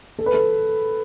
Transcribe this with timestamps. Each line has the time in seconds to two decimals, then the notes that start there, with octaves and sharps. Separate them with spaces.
0.19 A4
0.26 B4
0.34 A4